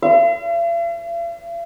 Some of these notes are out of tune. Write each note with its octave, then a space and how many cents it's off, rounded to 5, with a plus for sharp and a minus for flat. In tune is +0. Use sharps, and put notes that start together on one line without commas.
F5 -45